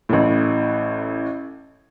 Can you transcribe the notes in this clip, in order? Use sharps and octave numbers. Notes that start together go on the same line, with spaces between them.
A1 A2